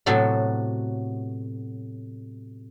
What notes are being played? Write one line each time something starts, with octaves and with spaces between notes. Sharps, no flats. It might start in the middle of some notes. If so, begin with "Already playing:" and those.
A2 C3 F#3 B3 F#4 A4